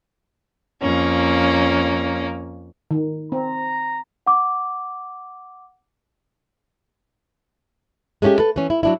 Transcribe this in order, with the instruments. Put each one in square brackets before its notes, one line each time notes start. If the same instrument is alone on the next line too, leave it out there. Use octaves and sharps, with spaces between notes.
[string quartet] F2 A#3 C#4
[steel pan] D#3
[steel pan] C4 [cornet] A#5
[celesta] F#5 D6
[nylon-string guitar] G#3 A3 C#4 F#4 G4
A4 B4
E3 C#4
E4
F#3 D4 E4